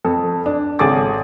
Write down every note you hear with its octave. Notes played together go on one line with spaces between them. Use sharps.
F2 A4
D4
G#1 C#3 G#4 A4 D6 A6